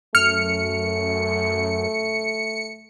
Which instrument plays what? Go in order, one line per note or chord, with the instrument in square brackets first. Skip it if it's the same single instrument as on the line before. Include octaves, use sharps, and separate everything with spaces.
[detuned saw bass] F#2 [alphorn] A3 [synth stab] F6 [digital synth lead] C#7